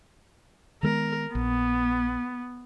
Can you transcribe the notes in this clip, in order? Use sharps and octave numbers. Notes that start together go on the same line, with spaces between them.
D#3 G#3 B3 A#4
A#1 B3